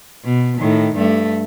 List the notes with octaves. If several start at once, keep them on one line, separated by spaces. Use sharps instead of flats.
B2
A2 D#3
G2 A3